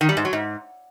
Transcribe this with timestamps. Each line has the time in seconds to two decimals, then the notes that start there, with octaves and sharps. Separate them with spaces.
0.01 D#3
0.09 G3
0.17 G#2
0.25 F#3
0.33 G#2